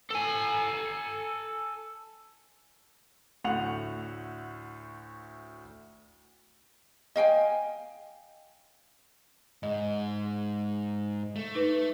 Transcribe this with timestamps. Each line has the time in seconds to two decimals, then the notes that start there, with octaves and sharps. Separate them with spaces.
0.11 A4 G#5
3.44 D2 A2 F#5 F7
7.16 D#5 F5 G5 G#5
9.63 G#2 D#5
11.36 A3
11.55 D#4 B4